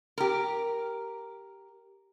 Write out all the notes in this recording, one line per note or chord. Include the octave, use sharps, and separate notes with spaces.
G4 A#4